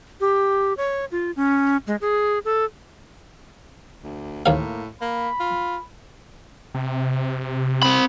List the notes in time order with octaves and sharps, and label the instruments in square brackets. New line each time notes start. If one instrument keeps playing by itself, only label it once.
[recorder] G4
C#5
F4
C#4
G#3
G#4
A4
[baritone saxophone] D2
[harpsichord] D#2 F5 [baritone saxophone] A2 [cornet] A#3
[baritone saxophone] A#3 [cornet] B5
[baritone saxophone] F4
[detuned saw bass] C3
[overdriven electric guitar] C4 B5